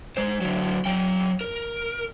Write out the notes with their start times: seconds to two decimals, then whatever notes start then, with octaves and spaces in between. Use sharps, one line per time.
0.17 G#3 C5
0.41 D3 F#3
0.86 F#3 G5
1.41 A#4